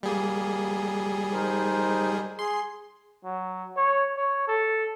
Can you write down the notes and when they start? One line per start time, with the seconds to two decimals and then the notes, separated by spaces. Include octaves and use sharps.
0.03 G3 A#3 G#4
1.32 D#4 A#4 C5
2.39 G#4 C6
3.25 F#3
3.77 C#5
4.17 C#5
4.48 A4